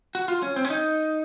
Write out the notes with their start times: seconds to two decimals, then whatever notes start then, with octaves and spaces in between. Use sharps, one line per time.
0.15 F#4
0.28 F4
0.42 C#4
0.56 C4
0.65 C#4
0.70 D#4